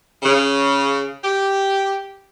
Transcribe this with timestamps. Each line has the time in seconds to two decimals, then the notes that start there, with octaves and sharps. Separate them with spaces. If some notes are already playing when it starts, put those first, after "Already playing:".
0.23 C#3
1.23 G4